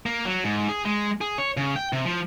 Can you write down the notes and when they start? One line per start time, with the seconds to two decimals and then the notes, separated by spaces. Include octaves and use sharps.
0.06 A#3
0.25 F#3
0.44 G#2
0.69 G#4
0.85 G#3
1.21 G#4
1.38 C#5
1.57 C#3
1.76 G5
1.93 C3
2.05 F3